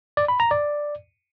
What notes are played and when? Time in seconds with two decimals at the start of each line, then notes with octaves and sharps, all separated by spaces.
0.17 D5
0.28 B5
0.40 A#5
0.51 D5